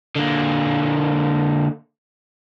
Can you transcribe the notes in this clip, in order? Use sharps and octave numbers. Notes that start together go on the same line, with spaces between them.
D3 A#3